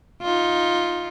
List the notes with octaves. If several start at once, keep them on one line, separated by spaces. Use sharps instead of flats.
D#4 F4